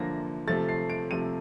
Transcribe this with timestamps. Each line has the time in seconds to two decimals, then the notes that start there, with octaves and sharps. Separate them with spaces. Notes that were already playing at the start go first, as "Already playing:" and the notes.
Already playing: D3 F3 A#3 A#6
0.47 C3 F3 A3 A6
0.69 C7
0.90 D7
1.11 C3 F3 A3 D#7